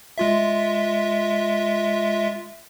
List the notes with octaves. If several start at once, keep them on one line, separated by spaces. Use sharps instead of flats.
G#3 F4 E5